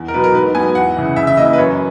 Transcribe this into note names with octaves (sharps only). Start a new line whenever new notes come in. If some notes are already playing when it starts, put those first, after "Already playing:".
Already playing: E2
A#4
B2 F#3 B4
A#4
G#2 B4
F#3 B3 G#5
E2 F#5
C#3 E3
C#3 E5
E5
E3 A#3 D#5
B4
F#2 C#5